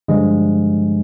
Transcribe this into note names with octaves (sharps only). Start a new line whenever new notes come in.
G2 D3 F3 G#3